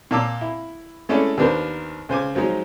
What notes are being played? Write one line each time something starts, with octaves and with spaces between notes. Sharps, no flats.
A#2 A#3 D5 A5 D6 E6
E4
G#3 A3 C#4 E4 A4 D5
D#2 B3 D4 A#4 C5
C#2 C5 G#5 D6
F3 F#3 G#3 D#4